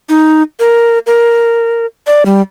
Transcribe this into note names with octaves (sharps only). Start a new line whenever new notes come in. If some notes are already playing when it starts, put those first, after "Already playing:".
D#4
A#4
A#4
D5
G3